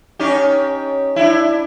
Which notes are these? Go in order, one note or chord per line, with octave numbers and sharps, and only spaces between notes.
C#4 D#4 G4
D4 E4